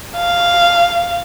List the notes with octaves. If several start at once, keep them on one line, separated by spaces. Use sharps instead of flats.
F5